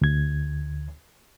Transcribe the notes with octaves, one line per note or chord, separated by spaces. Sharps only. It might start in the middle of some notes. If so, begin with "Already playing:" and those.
D2 G#6